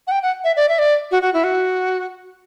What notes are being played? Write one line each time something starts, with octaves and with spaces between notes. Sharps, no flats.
F#5
G5
F#5
E5
D5
E5
D5
F#4
F#4
E4
F#4